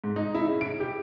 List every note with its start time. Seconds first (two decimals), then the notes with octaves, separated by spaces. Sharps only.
0.04 G#2
0.16 D#4
0.35 E4
0.46 C#3
0.61 D7
0.80 G4